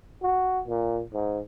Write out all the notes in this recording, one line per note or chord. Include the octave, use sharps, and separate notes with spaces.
F#4
A#2
G#2